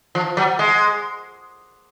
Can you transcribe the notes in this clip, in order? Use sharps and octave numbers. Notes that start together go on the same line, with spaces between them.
F3
F#3
G#3